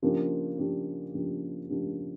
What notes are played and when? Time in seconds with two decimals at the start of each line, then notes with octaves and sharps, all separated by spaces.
0.02 C#3 F3 A#3 D4 G4
0.58 C#3 F3 A#3 D4 G4
1.14 C#3 F3 A#3 D4 G4
1.70 C#3 F3 A#3 D4 G4